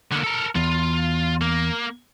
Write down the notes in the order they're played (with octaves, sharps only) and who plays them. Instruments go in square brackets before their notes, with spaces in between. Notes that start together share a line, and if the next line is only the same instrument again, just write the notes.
[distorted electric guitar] D3 A#3
A4 A#4
[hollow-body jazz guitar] E2 [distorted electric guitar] F4
[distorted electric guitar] A#3